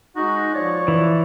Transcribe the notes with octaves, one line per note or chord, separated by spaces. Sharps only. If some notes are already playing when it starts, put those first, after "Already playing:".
G#3 D#4 F#4
F3 C#5 D5
E3